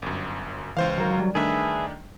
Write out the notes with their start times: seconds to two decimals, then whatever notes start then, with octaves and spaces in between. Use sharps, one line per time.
0.02 G1 F#2
0.77 C#2 E3 C5 F5
0.98 D#3 F#3 A#4
1.19 G3
1.35 D#3 A3 D4 G#4 B4 E5